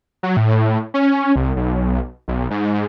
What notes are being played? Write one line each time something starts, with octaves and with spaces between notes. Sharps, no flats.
F#3
A2
C#4
C2
B1
B1
G#2